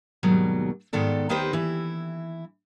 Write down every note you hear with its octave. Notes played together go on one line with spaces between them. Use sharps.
D#2 G#2 B2 F#3 G3
G#2 D#3 B3 A4 D5
D#2 D#3 D#4 G4 B4 C5
E3 E4